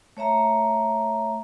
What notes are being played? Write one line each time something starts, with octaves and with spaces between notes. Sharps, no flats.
A3 C#5 E5 A#5